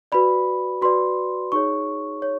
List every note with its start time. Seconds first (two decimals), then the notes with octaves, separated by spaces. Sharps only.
0.12 F#4 B4 D5 B5
0.82 F#4 B4 D5 C6
1.52 D#4 G#4 C#5 C#6
2.22 C#5